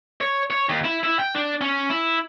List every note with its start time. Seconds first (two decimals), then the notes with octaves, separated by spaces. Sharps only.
0.21 C#5
0.51 C#5
0.69 D#2
0.84 E4
1.03 E4
1.19 G5
1.35 D4
1.61 C#4
1.90 E4